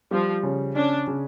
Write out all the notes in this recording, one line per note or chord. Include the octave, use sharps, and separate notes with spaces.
F3 G3
C#3
C#4 D4
C#3